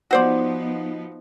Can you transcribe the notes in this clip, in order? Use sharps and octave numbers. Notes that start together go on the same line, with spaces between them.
F3 B3 D#4 F#4 C5 D5